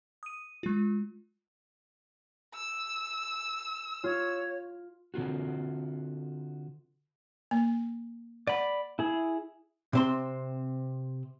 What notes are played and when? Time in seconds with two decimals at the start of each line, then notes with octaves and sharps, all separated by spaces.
0.23 D#6 D#7
0.63 G#3 F4
2.54 E6
4.04 F4 C#5
5.14 D3 C4 F4 F#4
7.51 A#3
8.47 D5 F#5 B5
8.99 E4 G#4
9.93 C3 C4 C6